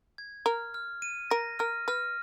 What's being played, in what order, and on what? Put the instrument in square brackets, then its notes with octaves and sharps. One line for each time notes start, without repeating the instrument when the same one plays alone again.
[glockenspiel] G#6
[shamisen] A#4 [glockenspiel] F6
[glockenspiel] F6
D#7
[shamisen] A#4 [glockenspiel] A#6
[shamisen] A#4 [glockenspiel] F6
[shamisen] B4 [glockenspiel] F6